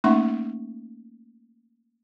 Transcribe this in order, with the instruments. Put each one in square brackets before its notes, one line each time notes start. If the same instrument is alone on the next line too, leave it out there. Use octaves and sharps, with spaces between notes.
[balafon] A3 A#3 C#4 D#4 E5 C#6